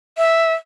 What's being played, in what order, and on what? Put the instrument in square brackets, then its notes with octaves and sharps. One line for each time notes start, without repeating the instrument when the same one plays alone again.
[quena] E5